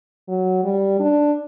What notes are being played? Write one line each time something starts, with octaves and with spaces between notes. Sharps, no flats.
F#3
G3
D4